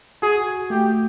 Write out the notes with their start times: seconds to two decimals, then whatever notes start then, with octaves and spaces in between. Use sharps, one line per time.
0.22 F#4 G#4
0.70 A3 G4